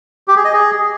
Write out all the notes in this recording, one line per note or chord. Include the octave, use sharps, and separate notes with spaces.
G4
G#4
D#5
G#4